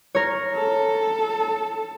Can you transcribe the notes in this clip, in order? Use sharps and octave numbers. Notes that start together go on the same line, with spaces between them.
A#4 C#5
A4